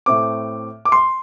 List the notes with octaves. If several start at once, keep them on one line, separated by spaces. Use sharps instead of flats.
A2 A3 C4 D6
D6
C6